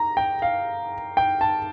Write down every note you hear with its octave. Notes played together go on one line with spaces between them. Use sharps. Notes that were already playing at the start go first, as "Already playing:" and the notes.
Already playing: A#5
G5
F5
G5
A5